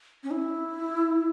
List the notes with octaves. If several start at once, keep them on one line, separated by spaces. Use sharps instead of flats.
C#4
E4